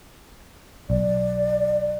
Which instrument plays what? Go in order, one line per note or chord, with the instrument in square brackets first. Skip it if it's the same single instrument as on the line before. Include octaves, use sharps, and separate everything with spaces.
[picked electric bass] B1 [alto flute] D5